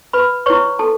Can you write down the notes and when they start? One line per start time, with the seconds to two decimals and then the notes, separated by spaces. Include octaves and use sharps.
0.13 B4 B5
0.46 E4 B4 C#5 C#6
0.79 A4 A5